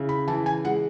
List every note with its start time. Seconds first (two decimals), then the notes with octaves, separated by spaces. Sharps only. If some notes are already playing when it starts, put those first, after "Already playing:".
Already playing: C#3 E4
0.09 B5
0.27 E3 A5
0.46 G#5
0.65 G#3 F#5